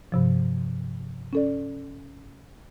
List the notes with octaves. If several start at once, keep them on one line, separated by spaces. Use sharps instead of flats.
G2 C3 F3
C#4 A4 D5